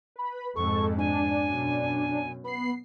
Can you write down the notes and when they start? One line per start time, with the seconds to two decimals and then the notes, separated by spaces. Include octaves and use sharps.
0.16 B4 B5
0.55 F2 G#2 A4 C#6
0.98 D4 G#5
1.43 F#2 B2
2.44 B3 B5 C7